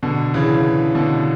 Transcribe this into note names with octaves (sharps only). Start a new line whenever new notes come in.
B2 D3
C#3 E3
B2 D3